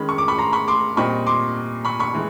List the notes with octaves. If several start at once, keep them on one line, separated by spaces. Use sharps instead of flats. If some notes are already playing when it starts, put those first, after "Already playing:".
Already playing: D#3 G#3 C#4 B5
C#6
D6
B5 C#6
A#5 C6
B5 C#6
C6 D6
A#2 G3 C4 D#4 B5 C#6
C6 D6
B5 C#6
B5 C#6
E3 G#3